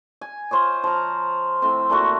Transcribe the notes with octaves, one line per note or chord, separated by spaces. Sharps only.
G#5
F4 C5 C#5 D#5
F3 A#5
A2 C4
A#2 A3 F#4